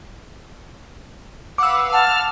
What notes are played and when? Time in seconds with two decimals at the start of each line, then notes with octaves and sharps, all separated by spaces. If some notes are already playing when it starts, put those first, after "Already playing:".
1.58 B4 F5 F#5 D6 E6
1.93 F#5 A5 F6